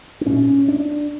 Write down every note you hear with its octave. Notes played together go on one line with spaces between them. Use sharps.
D4
A#2 C#4
D4